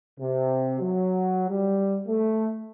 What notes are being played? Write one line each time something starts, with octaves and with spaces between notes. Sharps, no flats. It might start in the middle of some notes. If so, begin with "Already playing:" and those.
C3
F#3
G3
A3